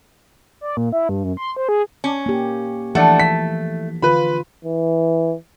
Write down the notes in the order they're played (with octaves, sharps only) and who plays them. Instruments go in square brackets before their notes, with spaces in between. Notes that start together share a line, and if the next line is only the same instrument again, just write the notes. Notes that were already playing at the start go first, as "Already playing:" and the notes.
[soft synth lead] D5
A#2
E4
G2
F#2
C6
C5
G#4
[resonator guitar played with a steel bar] C#4
[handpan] A#3 G4
[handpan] E3 F3 [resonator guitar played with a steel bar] A3 [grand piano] D4 F#5
[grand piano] B6
[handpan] D3 F4 [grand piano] B4 B5
[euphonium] E3